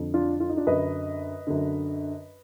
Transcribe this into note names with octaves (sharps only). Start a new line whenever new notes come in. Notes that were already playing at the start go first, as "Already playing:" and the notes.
Already playing: F2 D3
D4 F4
F4
D#4
D4 F4
F#2 D3 B4 D#5
F#2 D3